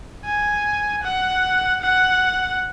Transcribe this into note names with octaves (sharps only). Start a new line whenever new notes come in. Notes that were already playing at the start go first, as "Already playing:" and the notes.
G#5
F#5
F#5